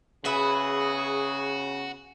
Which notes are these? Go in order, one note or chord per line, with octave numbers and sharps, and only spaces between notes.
C#3 B3 F#4 G#4 B4 E5